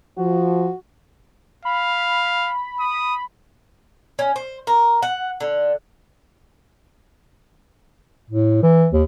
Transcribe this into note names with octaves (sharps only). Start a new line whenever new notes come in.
F3 F#4
F5 B5
D#6
C#4
C5
A#4
F#5
D3
A2
E3
D#2